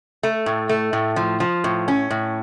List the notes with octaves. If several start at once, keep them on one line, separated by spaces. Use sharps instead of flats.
A3
A2
A3
A2
F3
F3
A2
C#4
A2